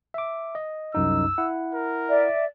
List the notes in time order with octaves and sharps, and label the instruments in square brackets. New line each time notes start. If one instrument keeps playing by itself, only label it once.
[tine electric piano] E5 D6
D#5
[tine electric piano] C2 F#2 D#4 [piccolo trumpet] E6
[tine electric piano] E4 F#5
[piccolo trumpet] A#4
[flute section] D5 E5